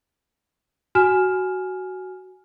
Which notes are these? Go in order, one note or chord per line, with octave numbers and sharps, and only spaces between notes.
F#4 G#5 F6 E7